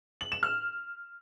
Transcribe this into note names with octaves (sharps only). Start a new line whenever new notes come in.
F#7
E7
F6